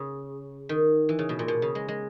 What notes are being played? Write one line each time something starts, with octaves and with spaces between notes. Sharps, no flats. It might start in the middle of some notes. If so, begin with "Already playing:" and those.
Already playing: C#3
D#3
E3
C#3
B2
A#2
B2
C#3
G#3
G#3